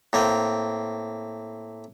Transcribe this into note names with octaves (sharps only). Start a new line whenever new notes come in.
A2 A#3 C4